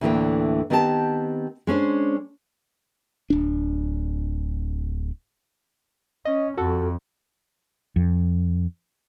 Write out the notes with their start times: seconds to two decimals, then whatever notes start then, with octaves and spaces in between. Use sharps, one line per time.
0.01 D2 A2 D3 E3 A#3 G5
0.70 D#3 B3 C4 G4 D#5 A5
1.67 G#3 C#4 D4 C5
3.30 D1 D4
6.25 C#4 D#5
6.57 F2 F#4 A4
7.96 F2